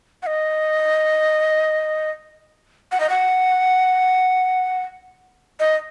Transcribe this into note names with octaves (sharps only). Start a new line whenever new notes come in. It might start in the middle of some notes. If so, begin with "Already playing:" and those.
F#5
D#5
F#5
D#5
F#5
D#5